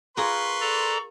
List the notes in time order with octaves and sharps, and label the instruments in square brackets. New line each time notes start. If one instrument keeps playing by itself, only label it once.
[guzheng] F4 G#4 A#4 [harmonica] B4 C6 [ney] C#6
[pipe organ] A4 D5 A#5